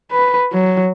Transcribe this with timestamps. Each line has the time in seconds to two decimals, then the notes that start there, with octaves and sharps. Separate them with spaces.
0.12 B4
0.52 F#3